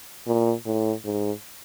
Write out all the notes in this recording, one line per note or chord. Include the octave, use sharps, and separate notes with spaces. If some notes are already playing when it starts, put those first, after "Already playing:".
A#2
A2
G#2